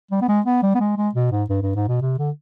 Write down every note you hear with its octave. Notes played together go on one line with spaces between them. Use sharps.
G3
B3
G#3
B3
G3
B3
G#3
G#3
B2
G#2
G2
G2
G#2
B2
C3
D3